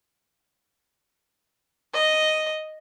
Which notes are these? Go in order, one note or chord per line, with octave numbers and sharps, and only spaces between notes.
D#5